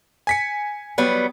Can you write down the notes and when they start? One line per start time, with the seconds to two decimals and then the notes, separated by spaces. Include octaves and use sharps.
0.27 G#5 B6 C#7
0.98 F#3 G3 B3